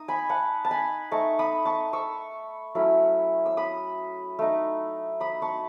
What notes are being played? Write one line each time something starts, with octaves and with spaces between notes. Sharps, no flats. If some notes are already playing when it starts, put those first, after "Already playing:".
Already playing: D#4 D#6
G#5 B5
F#5 A5
A5
G#5 B5
A3 D#4 A5 C#6
B5 D#6
A5 C#6
C#6 E6
F#3 A3 C#4 E4
E6
B5 D#6
A3 D#4
B5 D#6
A5 C#6